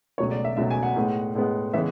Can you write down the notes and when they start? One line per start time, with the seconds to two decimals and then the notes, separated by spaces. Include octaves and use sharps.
0.18 C#2 B2 F#3 A3 C#5
0.31 D5
0.45 E5
0.57 C#2 B2 F#3 A3 E5
0.71 G#5
0.83 F#5
0.96 A2 G#3 B3
1.35 A2 G#3 B3
1.74 C#3 E3 G#3 B3 E5